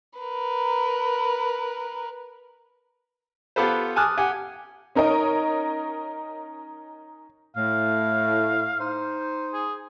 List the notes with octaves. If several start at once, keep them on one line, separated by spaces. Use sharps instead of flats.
A#4 B4
B3 F4 G4 A4 B4 C5
G#5 A5 D6 D#6 F6 F#6
G4 F#5 G#5
C#4 D#4 A#4 C#5 D#5
A2 F5
D#4 C5
G#4